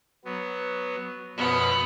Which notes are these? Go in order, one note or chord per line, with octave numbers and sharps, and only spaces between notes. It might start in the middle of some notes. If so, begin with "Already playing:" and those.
F#3 B3
F#2 B2 F3 B3